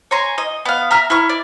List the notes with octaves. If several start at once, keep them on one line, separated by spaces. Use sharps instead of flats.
C#5 G#5 A#5 C6
D#5
B3 F5
E5 A#5 F6
E4 C#6 F6
D5